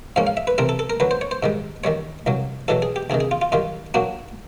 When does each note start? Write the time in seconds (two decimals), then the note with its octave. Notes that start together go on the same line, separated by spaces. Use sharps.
0.16 G#2 F3 A#3 C#4 F5
0.27 F5
0.37 E5
0.47 B4
0.58 C3 E3 A3 C4 A#4
0.69 A4
0.79 A4
0.90 A#4
1.00 D2 D3 F#3 B4
1.11 C5
1.21 C#5
1.31 C5
1.43 G#2 D#3 G3
1.84 D#2 D#3 G3 C#5
2.26 C2 A#2 F#3
2.68 E2 B2 F#3 A3 A4
2.82 G#4
2.96 G4
3.10 D2 C3 D#3 G#4
3.20 G#4
3.31 F4
3.42 F4
3.52 F#2 D#3 G3 F4
3.94 A#2 F#3 A#3 D4 F#4